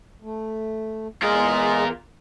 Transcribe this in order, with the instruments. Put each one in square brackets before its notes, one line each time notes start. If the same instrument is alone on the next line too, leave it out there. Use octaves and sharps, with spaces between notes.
[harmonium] A3
[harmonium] E2 [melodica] G#3 G#4 [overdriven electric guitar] F4 A#4